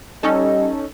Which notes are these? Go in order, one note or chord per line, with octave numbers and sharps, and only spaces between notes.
G3 C#4 D#4 A4 D#5